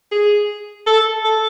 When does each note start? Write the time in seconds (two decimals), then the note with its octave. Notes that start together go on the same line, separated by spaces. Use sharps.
0.12 G#4
0.86 A4
1.24 A4